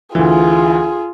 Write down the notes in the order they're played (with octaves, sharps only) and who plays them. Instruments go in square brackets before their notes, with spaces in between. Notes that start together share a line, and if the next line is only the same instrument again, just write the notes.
[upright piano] D2 E3 [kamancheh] F4 G#4